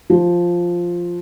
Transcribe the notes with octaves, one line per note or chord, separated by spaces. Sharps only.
F3